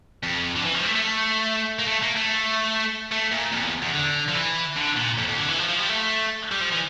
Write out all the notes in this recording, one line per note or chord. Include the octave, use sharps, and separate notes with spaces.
F2
D3
E3
F3
G3
A3
A3
A#3
A3
A#3
A3
A3
A#2
F2
E2
E2
D3
F3
E3
D3
A#2
F2
F2
D3
E3
F3
F3
G3
A3
G3
F3
E3